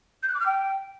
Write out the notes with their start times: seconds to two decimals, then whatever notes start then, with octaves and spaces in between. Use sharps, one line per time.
0.23 G6
0.29 F#6
0.34 D6
0.40 F6
0.46 G5